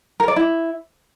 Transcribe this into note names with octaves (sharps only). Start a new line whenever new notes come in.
A#4
D5
E4